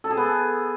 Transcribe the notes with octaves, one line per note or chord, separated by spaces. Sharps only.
A4
G#4
B3